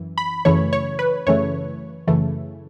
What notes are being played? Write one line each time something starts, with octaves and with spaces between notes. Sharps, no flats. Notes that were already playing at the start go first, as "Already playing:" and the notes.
Already playing: F#2 E3
B5
F#2 C#3 E3 A3 C#5
C#5
B4
F#2 C#3 E3 A3 C#5
F#2 C#3 E3 A3